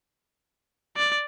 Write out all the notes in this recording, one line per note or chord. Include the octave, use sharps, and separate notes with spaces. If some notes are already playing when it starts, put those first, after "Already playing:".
D5